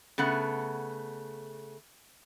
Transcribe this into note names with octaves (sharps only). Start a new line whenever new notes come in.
C#3 A3 B3 F#5